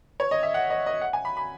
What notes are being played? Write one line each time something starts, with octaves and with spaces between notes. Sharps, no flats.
C#5
D#5
E5
F#5
D#5
D#5
F#5
G#5
B5
B5